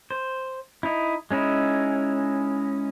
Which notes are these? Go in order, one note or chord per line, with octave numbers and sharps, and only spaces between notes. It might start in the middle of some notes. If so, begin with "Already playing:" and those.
C5
D#4 E4
G#3 C#4 D#4 E4